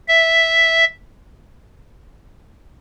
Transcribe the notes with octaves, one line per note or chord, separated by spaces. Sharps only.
E5